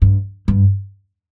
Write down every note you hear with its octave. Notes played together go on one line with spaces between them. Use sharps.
G2
G2